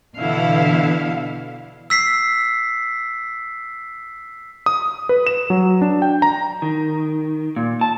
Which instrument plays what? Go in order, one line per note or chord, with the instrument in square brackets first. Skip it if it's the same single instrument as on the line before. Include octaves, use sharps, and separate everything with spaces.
[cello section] B2 D3 E3 B3 E4 F5
[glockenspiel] E6 B6 C7
[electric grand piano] D#6
B4
E7
F#3
D4
G5
A#5
[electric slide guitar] D#3
A#2
A5